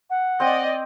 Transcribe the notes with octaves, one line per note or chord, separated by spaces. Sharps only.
F#5
C4 D5 D#5 G5